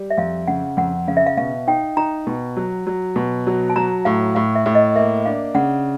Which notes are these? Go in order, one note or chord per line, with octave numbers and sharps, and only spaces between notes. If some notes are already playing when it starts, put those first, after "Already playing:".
Already playing: G3
E5
F2 F5
C#3 F#5
F2 F#5
C#3 F5
E5
F5
B2 F5
D#4 G5
D#4 A#5
B2
F#3
F#3
B2
F#3
A5
F#3 A#5
A2 F5
A2 F5
E5
A2
D#5
A#3 E5
D4 F5
C#3 F#5